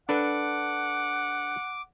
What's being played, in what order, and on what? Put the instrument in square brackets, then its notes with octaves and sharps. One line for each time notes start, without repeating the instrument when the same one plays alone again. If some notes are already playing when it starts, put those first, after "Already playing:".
[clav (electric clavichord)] D4 A4 B4 [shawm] F#5 [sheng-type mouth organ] D6